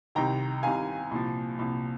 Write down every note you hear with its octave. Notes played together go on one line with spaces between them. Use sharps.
C2 C3 D#3 G5 A#5
C2 C3 D#3 F5 G#5
C2 A#2 F3
C2 A#2 F3